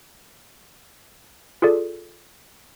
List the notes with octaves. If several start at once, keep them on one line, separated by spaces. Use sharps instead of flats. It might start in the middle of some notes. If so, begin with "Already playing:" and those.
F4 G#4 A4 D5